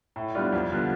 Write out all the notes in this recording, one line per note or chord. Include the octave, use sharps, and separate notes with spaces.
A2
G3 B3 D4 F4
F2
D3 G3 B3 F4